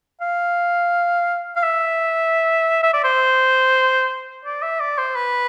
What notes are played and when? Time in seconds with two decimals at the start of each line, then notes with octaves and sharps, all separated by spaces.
0.21 F5
1.56 F5
1.63 E5
2.83 E5
2.93 D5
3.04 C5
4.45 D5
4.62 E5
4.80 D5
4.98 C5
5.15 B4